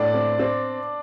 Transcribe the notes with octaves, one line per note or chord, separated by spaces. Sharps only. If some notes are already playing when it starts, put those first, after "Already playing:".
Already playing: A2 D4 D5
C4
C4